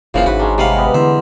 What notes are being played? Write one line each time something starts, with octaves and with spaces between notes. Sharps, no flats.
F#1 A#2 C#3 E3 F3 F4
G#1 G#2 F#4 B4
G#3 C#4 D4 G#4 A#4
C3 G3 G#4 B4 F5 F#5 G#5
B3 G4 A#4
E2 D3 E5 F#5 C6